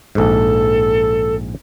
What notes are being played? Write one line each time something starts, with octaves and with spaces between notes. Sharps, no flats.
A#1 G#2 A4